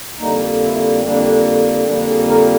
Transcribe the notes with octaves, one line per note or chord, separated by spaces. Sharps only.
F2 D3 G3 A#3 D#4
E4
F2 D3 G3 A#3 D4
F2 D3 G3 A#3 D4
G#4
A#4